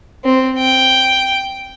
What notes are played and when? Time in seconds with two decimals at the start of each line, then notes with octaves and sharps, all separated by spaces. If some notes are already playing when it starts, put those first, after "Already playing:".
0.25 C4
0.58 G5